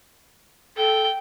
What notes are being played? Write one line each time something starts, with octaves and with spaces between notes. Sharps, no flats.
A4 G5